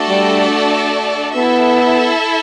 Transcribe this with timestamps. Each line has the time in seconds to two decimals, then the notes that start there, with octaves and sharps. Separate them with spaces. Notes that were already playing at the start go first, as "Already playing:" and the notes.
Already playing: A3 D4 F#4 A4 D5
0.09 G3
1.35 B3 E4 A4 E5